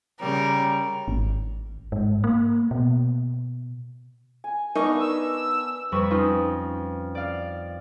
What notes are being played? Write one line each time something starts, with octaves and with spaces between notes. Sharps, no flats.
C#3 G3 A#4
G#1
G#2
A#3
B2
G#5
B3 D4 D#4 A#4 C#6
E6
F2 G3 B4 C#6 E7
C#4 D#4 F4
D5 F5